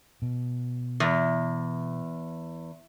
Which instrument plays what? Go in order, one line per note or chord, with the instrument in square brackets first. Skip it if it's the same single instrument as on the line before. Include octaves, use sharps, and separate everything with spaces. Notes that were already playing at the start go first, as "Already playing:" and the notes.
[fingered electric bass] B2
[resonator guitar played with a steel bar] E2